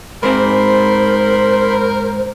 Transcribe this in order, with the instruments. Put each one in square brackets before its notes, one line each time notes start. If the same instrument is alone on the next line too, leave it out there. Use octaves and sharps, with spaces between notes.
[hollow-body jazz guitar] G#2 C4 [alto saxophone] A#4 [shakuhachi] C5 [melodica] B5 C6